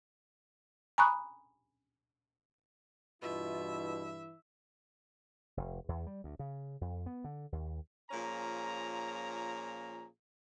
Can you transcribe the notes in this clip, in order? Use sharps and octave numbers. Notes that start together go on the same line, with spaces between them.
G#5 A#5 B5 C#6 D#6 F#6
G2 B2 E3 E4 F4 E5
F1
E2
G3
D2
C#3
F2
B3
D3
D#2
A#2 F3 C#4 G#4 A#5